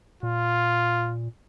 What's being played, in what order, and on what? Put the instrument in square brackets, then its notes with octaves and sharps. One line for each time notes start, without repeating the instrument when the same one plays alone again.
[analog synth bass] A#2 [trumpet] F4